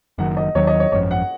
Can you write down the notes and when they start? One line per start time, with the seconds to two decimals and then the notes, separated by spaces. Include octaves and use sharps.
0.18 F#1 F#2 D#3 F#5
0.37 D#5
0.55 D#2 D#3 F#3 C#5
0.67 D#5
0.80 C#5
0.92 G#1 F#2 F3 C#5
1.11 F#5